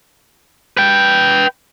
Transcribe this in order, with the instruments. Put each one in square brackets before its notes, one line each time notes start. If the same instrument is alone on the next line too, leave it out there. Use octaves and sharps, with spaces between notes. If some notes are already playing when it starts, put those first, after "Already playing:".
[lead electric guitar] B4 G5